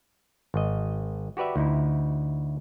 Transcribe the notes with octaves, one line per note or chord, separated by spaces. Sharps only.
G#1 D#5
F#4 G4 B4 D5 E5
D2 D#4 E4